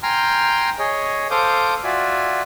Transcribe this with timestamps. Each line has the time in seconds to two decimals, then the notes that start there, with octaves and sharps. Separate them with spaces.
0.03 G5 G#5 A#5 C6 F6 G6
0.79 G#4 C#5 D#5
1.31 A4 C5 F5 D6 D#6 G6
1.84 F4 F#4 D5 E5 G#5